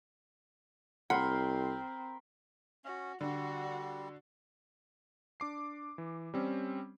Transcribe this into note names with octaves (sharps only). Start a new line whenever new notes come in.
C2 C4 A#4 F#5 B5 C6
C#4 F#4
D3 G3 F#4
D4 D6 C7
E3
G3 C4 C#4